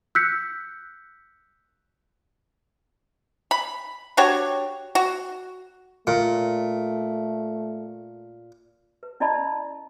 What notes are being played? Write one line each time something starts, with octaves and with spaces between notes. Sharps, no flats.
E6 F#6 G6 B6 C#7
B5
D4 F#4 G4 C#5
F#4
A#2 A3
B4
C#4 E4 D5 D#5 A5 B5